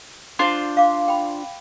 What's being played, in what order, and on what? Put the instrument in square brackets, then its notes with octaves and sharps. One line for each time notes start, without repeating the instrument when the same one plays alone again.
[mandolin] D4 F4 C5
[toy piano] F5 D6
G5 B5